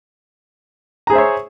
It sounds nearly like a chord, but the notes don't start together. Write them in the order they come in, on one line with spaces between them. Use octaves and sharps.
A#5 G#4 C5 E5 C#5